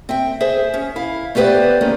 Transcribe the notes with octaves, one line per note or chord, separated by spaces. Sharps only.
C4 E5 G5
G#4 C5 E5
C#4
E4 F5
A3 B3 G4 B4 C5 D5
D#3 F3 G#3 A#3 C#4